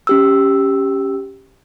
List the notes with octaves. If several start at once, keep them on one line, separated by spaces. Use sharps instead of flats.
C#4 G4 E6